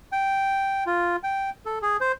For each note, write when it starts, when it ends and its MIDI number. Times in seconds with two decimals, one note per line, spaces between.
0.12 0.84 79
0.86 1.16 65
1.23 1.50 79
1.66 1.79 69
1.82 1.97 68
2.01 2.12 72